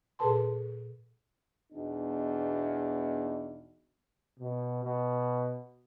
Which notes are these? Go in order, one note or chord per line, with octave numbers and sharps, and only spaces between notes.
A#2 G#4 A4 B4 A5 C6
E2 B2 D4 D#4
B2
B2